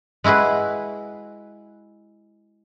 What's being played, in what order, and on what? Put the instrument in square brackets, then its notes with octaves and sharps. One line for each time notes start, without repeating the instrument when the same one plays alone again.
[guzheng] G#3 E4 F#4 G#4 B4